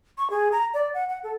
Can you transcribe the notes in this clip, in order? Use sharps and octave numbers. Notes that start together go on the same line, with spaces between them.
C#6
G#4
A#5
D5
F#5
F#5
A4